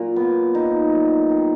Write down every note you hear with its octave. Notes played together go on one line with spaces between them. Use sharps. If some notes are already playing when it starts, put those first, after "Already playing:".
Already playing: A#2 F#3 F4
B3
D#4
F#3
D#3